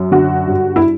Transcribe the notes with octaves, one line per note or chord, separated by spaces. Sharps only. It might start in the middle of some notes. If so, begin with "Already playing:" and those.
Already playing: F#2
D3 F#4
G2
E4